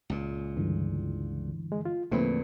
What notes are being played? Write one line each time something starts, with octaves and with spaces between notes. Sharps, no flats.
C#2 A#2
G2 D3 E3
G#3
F4
E2 A#2 D3 F3 A3 A#3 C4 B4